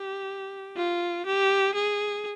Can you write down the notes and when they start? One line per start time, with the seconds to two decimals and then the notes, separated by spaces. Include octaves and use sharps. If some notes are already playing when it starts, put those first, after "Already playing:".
Already playing: G4
0.77 F4
1.26 G4
1.75 G#4